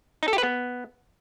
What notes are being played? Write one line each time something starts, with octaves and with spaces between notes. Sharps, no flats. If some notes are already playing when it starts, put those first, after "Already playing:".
D#4
A4
G4
B4
B3